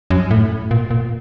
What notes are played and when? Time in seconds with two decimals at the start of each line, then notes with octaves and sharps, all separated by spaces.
0.10 F#2
0.31 A2
0.71 A#2
0.91 A#2